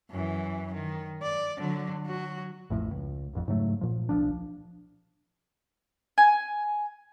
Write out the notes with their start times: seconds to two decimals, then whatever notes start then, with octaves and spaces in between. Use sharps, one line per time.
0.10 F#2 E3
0.74 D#3
1.22 D5
1.58 D3 F#3
2.05 F#3 F#4
2.70 A1 F2 A2
2.91 C#2
3.33 E1 A1 F2
3.48 G#2 C#3 F#3 A3
3.81 A#2 F3
4.09 D1 B1 F3 D4
6.18 G#5